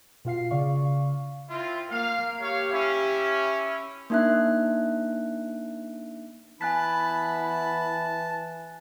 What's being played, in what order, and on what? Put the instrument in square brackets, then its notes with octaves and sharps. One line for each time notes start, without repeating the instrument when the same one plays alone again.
[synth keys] B2 F4 F5 C7
C#3 D5 F5 C#6
[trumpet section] C4 E4 F4
[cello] A#3 [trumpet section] F5
[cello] G4 [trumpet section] C#5 F5
[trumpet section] C#4 E4
[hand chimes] A#3 D4 D#4 E5 F#6
[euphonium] E3 [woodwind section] B3 E4 B5 [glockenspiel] G#5 F#6 B6 [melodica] A5